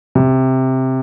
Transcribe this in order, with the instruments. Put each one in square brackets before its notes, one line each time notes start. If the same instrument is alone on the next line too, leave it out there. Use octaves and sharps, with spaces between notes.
[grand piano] C3